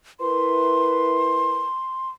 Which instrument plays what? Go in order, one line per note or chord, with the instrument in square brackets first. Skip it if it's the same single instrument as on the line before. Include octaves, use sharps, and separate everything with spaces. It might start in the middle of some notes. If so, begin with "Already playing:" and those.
[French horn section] E4 A#4 B4 [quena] C6